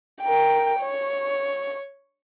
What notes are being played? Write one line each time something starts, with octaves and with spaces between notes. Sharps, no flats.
A#4 G5
C#5